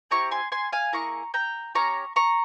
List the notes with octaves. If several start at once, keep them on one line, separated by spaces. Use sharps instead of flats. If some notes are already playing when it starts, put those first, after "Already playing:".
C4 E4 G4 A#5 C#6
G#5 C6
G#5 C6
F5 G#5
A#3 E4 G#4 A#5 C#6
G5 A#5
C#4 G4 A#5 C#6
A#5 C#6